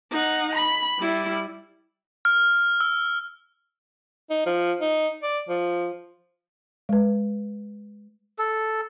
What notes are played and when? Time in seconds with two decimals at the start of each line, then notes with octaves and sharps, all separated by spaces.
0.11 D#4 F#5
0.55 B5
0.99 G3 E4
2.25 F6
2.80 E6
4.30 D#4
4.46 F3
4.81 D#4
5.23 D5
5.49 F3
6.89 G#3 B4
8.39 A4